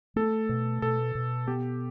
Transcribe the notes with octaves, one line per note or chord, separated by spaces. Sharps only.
A3 A4
B2
B2 A4
B2
B3 G4